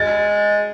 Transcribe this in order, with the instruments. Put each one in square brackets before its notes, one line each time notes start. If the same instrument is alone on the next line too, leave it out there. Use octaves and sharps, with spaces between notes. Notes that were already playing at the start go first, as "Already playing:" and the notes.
Already playing: [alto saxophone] G#3 [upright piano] A6